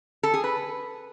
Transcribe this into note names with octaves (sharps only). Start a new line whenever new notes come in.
A4
G#4
B4